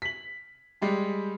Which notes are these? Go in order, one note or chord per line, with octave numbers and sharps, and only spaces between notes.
B6 F#7
G3 G#3 G4